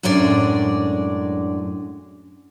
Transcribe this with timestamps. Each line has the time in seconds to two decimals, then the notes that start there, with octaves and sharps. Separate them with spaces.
0.03 F#2 A2 G#3 D4 D5